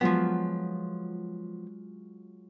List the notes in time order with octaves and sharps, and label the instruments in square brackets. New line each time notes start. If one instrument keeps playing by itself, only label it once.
[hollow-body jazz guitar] F3 B3 [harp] F#3 G#3 F4